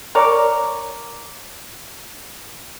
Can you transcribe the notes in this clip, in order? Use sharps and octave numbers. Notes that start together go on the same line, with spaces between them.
A#4 C#5 D5